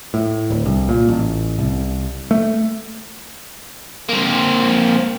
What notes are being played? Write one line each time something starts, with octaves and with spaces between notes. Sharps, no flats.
A2
D1
C2
A#2
A1
C2
A3
A#3 C4